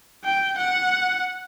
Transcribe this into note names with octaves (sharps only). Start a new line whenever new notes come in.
G5
F#5